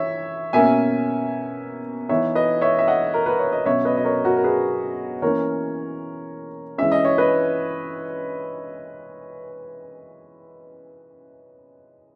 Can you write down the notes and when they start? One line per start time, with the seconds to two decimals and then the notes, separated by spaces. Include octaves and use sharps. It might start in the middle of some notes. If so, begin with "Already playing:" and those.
Already playing: E3 C#5 E5
0.53 B2 A#3 C#4 E5 G#5
2.09 E3 B3 D#4 C#5 E5
2.35 B4 D#5
2.61 C#5 E5
2.79 E5
2.87 D#5 F#5
3.14 A#4
3.26 B4
3.39 C#5
3.52 D#5
3.65 B2 F#3 C#4 C#5 E5
3.85 B4 D#5
3.97 D#5
4.05 A#4 C#5
4.25 F#4 A#4
4.37 A#4
4.44 G#4 B4
5.22 E3 A#3 C#4 A#4 C#5
6.78 E3 G#3 C#4 E5
6.92 D#5
7.05 C#5
7.18 B4 D#5